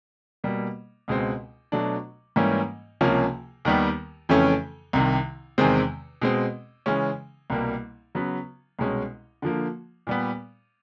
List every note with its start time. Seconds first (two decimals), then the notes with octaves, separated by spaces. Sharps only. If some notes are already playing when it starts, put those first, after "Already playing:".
0.44 B2 G3 A#3
1.08 C#2 B2 G#3 C4
1.72 B2 F#3 A3 D4
2.36 G#2 E3 G3 A#3 C#4
3.01 C#2 C3 F3 A#3 C#4
3.65 D#2 D#3 G3 B3
4.29 F2 C#3 E3 A3 C#4
4.93 C2 C3 D#3
5.58 E2 C3 D#3 G#3 C4
6.22 B2 G#3 C4
6.86 C#3 E3 G#3 C#4
7.50 C2 B2 G3 A#3
8.15 C#3 F#3 B3
8.79 C2 B2 G#3 C#4
9.42 D3 F3 A#3
10.07 A#2 G3 B3